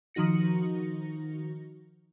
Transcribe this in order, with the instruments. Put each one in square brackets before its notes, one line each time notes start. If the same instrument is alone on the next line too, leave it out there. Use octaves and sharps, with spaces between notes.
[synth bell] D#3 F3 D#4 F#4 A#6 C#7